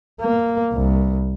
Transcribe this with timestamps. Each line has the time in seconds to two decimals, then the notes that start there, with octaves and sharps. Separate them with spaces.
0.21 A#3
0.72 C2